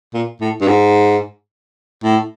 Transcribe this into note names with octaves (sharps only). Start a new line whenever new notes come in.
A#2
A2
G2
G#2
A2